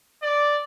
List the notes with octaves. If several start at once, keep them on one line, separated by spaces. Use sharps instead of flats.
D5